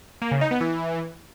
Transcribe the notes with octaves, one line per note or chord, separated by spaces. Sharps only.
A#3
C#3
D#4
B3
E3